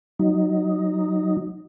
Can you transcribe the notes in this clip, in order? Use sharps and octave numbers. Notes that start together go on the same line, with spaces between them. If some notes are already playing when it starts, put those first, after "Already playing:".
F#3 D#4